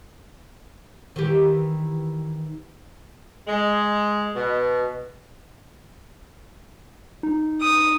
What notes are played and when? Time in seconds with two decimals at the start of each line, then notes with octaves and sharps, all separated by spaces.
1.16 D#3 E3 G4
3.47 G#3
4.35 B2
7.23 D#4
7.62 D#6